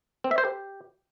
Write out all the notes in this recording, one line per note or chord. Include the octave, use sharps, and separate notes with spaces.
C4
E5
C5
G4